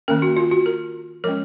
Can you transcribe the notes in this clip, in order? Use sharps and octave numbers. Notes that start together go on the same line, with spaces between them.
D#3 A#3 C#4 A#4
F#4
F4
F#4
A#4
F3 G#3 C#4 A#4